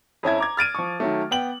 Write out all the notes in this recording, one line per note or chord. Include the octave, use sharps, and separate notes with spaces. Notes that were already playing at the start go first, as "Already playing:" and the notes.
F2 C#4 E4 G#6
A#5 D6 G#6
F6 A6 D7 D#7
F3 C#6
D#3 F#3 A3
B3 G5 F#7